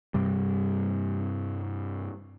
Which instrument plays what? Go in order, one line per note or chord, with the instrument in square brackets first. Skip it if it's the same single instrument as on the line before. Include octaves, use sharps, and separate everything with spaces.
[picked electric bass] G2 C3 G3